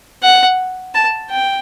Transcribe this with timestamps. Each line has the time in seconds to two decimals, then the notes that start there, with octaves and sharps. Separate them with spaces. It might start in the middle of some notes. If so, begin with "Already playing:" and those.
0.22 F#5
0.95 A5
1.30 G5